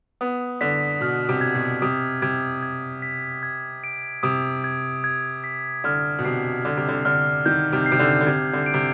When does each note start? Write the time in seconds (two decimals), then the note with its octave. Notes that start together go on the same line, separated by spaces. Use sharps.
0.21 B3 D#6
0.61 D3 B6
1.01 B2 F6
1.29 C3
1.41 G#6
1.54 B2
1.82 C3 D#6
2.22 C3 G#6
2.63 G#6
3.02 B6
3.43 G#6
3.84 D7
4.23 C3 D#6
4.64 G#6
5.04 G#6
5.44 B6
5.84 D3 F6
6.18 B2
6.25 C3 C7
6.65 D3 D6
6.77 C3
6.88 D3
7.05 D3 F6
7.46 D#3 G6
7.72 C3
7.86 C7
7.91 C3
7.99 D3
8.20 D3
8.26 C3 G#6
8.53 D3
8.66 D7
8.74 C3